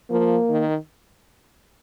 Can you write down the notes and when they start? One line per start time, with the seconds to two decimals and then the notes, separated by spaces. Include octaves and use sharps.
0.11 F3 A#3
0.49 D#3